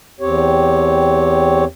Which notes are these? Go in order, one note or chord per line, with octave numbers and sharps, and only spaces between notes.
E2 C4 G4 C#5